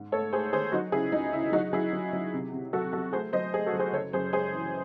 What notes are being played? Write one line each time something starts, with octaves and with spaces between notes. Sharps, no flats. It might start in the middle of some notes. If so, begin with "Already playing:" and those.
Already playing: G#2
A3 A4 C#5
A3 G#4 C5
D#3 G#4 C5
F#3 D#4 F#4
C#3 E4 G#4
C#2 D#4
C#3 E4
F#3 D#4 F#4
F#3 E4 G#4
F#3
F#3
C3
C3
F#3 F#4 A4
F#3 F#4 A4
A3 G#4 C5
F#3 C5 D#5
A3 G#4 C5
F#4 A4
F#3
G#4 C5
F#1 A4 C#5
F#2 G#4 C5
G#3 G#4 C5
E3